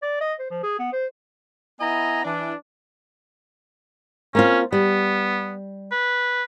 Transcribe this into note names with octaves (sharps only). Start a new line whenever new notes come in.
D5
D#5
C5
F3
G#4
B3
C5
B3 E4 D#5 G#5 A#5
E3 D4
A#3 C4 C#4 F4
G3 B3
B4